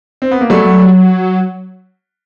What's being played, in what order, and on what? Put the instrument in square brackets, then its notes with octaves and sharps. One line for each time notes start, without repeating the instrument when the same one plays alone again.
[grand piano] C4
B3
A#3
[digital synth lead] F#3 [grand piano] G3 A3